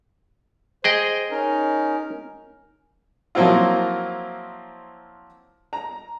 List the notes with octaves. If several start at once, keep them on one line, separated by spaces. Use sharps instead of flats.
G#4 C5 D#5 G5
C#4 D#4 A#4
F3 F#3 A#3 C4 E4 F4
A#5